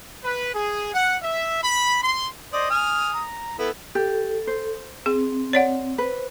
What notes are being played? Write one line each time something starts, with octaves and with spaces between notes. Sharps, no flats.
B4
G#4
F#5
E5
B5
C6
C5 D5 D#5 D#6
G#5 F6
A#5
B3 E4 A4
G4 A4
C5
C4 G#4
C#5 D5 F#5
B4 C5